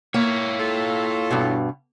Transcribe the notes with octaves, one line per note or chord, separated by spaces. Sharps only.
A#3 E4 C#5
F4 A4
G2 B2